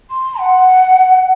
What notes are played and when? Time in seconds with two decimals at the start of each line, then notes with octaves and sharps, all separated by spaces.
0.10 C6
0.39 F#5